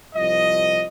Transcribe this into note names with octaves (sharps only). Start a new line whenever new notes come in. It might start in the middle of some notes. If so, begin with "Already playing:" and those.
C2 F3 D#5